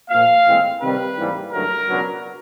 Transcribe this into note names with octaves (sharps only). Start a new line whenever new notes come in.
A#2 F3 A#3 F5
A2 E3 G#3 C4
C3 D#3 G3 B4
G#2 E3 G3 A#3
G2 D3 F#3 A3 A#4
C#2 B2 F#3 B3 D4